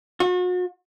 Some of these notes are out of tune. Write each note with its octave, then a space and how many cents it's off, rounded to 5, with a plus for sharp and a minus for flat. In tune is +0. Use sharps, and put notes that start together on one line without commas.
F#4 -40